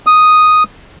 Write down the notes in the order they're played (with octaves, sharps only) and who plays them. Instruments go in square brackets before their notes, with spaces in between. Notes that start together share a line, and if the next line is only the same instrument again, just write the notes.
[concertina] D#6